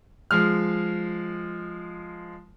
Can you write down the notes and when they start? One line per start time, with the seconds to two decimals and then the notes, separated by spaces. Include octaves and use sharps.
0.31 F3 G#3 F6